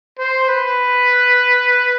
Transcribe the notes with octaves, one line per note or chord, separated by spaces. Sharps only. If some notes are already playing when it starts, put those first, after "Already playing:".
C5
B4